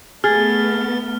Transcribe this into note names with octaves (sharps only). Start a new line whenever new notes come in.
A3 B3 G#4 F6 A6